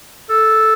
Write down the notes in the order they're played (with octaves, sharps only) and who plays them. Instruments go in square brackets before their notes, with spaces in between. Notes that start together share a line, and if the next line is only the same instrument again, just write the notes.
[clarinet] A4